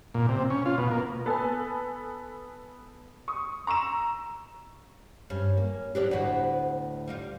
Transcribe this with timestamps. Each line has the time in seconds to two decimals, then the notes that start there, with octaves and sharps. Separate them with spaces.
0.14 A#2
0.29 C3
0.50 C#4
0.66 F4
0.78 B2
0.91 A#3
1.26 B3 A4 B4 G#5
3.28 C#6 D#6
3.67 A#5 C#6 E6 E7
5.30 G2 C#4
5.57 A#3
5.95 E3 B3 D4 G4 C#5 D5
6.11 D2 A2 B3 F#4 C5
7.08 G3 D#4 F4